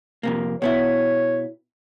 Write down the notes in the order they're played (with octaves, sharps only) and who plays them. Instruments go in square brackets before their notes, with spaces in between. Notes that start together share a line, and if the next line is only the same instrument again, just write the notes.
[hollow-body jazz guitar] F2 C3 A#3
[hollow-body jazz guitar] B2 B3 E4 [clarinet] C#5